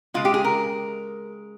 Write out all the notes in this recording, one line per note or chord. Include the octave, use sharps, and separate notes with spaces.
C#3 G#3 F4
G4
G#4
A#4